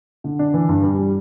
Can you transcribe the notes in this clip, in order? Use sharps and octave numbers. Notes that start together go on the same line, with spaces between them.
D3
D4
E3
G2
G3
G3